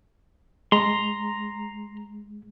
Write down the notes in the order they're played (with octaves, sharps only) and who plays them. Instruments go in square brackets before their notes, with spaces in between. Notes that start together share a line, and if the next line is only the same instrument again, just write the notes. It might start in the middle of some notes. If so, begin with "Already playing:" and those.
[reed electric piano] G#3 [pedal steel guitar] A#5 C6